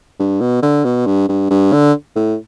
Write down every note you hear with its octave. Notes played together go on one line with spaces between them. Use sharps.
G2
B2
D3
B2
G2
G2
G2
D3
A2